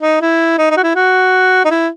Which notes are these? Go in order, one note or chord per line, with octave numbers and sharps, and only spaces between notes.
D#4
E4
D#4
D#4
F#4
E4
F#4
D#4
E4